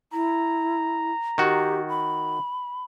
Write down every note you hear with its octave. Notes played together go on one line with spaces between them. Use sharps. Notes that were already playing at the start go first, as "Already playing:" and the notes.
E4 A#5
D#3 F#4 G4
B5